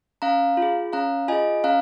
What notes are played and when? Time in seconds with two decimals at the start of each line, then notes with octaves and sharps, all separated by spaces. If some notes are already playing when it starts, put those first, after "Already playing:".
0.22 C#4 F5 A#5
0.57 F4
0.62 G#4
0.93 C#4 F5 A#5
1.28 F4 G#4 D#5 G#5
1.64 C#4 F5 A#5